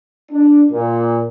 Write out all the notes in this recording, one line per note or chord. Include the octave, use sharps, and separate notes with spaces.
D4
A#2